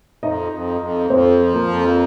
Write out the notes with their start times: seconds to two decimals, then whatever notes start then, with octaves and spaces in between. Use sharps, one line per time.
0.23 F2 D#4 D#5
0.52 F2
0.81 F2
1.10 F2 C4 C5
1.39 F3
1.53 A#3 A#4
1.68 F2